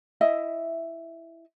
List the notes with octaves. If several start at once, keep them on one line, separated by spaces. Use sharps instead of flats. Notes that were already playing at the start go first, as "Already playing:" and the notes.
E4 D#5 E5